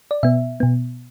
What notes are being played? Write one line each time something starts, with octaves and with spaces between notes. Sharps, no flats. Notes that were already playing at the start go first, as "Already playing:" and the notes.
D5
B2 B3 E5
B2 B3